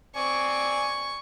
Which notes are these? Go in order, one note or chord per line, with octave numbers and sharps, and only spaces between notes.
C4 D5 G#5 C#6